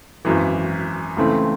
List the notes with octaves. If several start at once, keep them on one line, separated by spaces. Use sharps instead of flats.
G#1 F#2 E3
C#2 C#3 E3 A3 C4